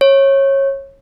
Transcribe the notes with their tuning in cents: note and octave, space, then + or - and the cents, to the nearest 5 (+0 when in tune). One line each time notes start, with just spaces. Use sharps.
C#5 -20